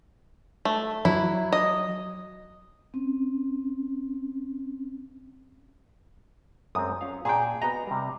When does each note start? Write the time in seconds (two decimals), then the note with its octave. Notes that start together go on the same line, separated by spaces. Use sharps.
0.65 A3
1.05 F#3 E4
1.52 D#5
2.94 C4 C#4
6.75 F#2 G#3 C4 D#6
7.01 C#4 F4 F5
7.25 A#2 G#4 G5 A5 A#5
7.62 B3 F#4 D#5 A#5
7.87 C3 G3